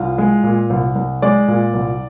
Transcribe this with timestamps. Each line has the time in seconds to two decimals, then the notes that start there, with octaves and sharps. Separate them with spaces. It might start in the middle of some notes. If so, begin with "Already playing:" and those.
Already playing: C2 F4
0.18 G#3
0.43 A#2
0.70 C2
0.95 C2
1.22 G#3 D5
1.48 A#2
1.73 C2